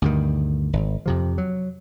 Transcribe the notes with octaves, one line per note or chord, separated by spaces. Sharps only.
D2 G2 D#3
G#1
F2 C3 F3
F#3